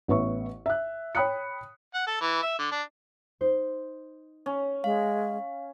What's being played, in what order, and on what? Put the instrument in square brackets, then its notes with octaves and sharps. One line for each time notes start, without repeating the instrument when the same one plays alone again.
[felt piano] A1 B3 C#5 E5 C#6
E5 F#6
C#5 G5 B5 D#6 F#6 C#7
[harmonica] F#5
A4
E3
E5
D3
D4
[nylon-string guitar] D#4 C5
[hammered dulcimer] C#4
[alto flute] G#3 [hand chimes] F5